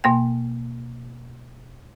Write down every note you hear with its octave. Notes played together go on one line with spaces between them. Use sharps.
B2 A#3 G5